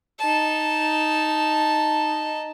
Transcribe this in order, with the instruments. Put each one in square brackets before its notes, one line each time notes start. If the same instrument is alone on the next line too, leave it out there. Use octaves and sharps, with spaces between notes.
[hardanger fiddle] D#4 A5